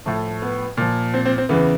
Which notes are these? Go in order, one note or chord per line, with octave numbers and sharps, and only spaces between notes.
A2 F3 A3
B3
A#2 F3
C4
C4
C4
E2 C#3 E3 B3